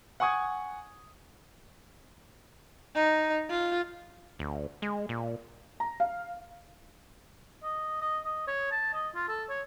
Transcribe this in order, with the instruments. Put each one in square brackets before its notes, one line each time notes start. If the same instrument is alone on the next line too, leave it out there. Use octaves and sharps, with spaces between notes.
[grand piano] F#5 G#5 C#6 D#6 G#6
[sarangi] D#4
F4
[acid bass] D2
G#3
A#2
[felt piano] A#5
F5
[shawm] D#5
D#5
D#5
C#5
A5
D#5
F4
A4
C#5